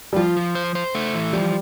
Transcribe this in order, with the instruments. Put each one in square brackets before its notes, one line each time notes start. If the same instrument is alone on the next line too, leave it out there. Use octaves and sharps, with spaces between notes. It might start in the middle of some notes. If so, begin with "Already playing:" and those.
[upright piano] G3
[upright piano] F3 [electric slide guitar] F4
[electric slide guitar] F3
C5
C5
A3
E3
[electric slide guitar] F3 [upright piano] G3